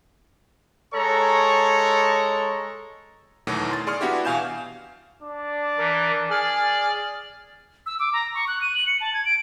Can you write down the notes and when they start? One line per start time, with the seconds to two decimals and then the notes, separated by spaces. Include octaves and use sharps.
0.94 G#3 A4 C#5 A#5 C#6
3.47 E2 B2 D#3 E3 F#3 A3
3.71 C6 A6
3.87 G#4 D5 C6 C#6 F6
4.01 B3 D4 E4 F#4 G4
4.25 B2 E3 F5 G#5 G6 E7
5.23 D4
5.78 E3 A#4
6.31 G#4 D5 F6
7.86 E6
7.99 D6
8.13 A#5
8.35 C#6
8.48 F#6
8.62 D#7
8.75 F#7
8.87 C#7
9.01 A5
9.14 G#6
9.25 D7